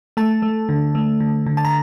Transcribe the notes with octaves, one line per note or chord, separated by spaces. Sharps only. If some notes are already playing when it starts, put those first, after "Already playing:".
A3 A5
A3
D3
A3
D3
D3
A5
A#5